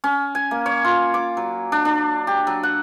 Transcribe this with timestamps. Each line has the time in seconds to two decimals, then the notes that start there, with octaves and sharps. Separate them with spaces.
0.04 C#4
0.35 G#5
0.51 A#3
0.66 C#5
0.84 F4
1.14 D6
1.37 F#3
1.72 D4
1.85 D4
2.27 G4
2.47 F#3
2.63 F#5